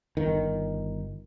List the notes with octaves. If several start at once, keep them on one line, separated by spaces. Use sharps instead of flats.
G1 D#3